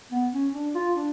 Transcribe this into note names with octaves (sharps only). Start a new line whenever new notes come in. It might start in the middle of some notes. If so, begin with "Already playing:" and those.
B3
C#4
D4
F4
D4